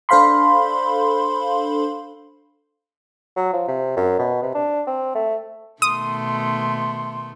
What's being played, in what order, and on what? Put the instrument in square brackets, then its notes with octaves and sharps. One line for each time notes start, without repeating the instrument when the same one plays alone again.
[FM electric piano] D4 A4 C5 F5 B5 C6
[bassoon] F#3
F3
C3
F#2
B2
C3
D4
C4
A3
[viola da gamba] B2 D#3 A3 [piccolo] C6 [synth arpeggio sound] D#6